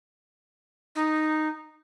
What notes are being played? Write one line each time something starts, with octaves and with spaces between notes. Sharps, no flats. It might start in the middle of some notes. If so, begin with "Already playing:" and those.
D#4